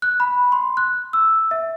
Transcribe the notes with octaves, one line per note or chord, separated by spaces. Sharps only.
F#6
B5
C6
F#6
E6
E5